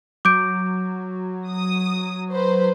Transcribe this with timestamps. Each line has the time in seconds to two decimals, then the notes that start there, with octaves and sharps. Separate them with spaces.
0.25 F#3 D6 G6 D7
1.49 D#6
2.31 B4 C5